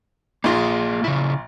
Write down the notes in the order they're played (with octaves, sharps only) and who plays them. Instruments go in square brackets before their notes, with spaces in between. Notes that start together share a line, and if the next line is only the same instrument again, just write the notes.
[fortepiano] A#1 F4 [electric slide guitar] A#3 G#4
[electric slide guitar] C#3 E4